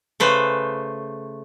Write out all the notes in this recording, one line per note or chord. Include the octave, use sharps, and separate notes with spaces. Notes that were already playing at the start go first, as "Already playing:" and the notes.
C#3 A3 B4 C5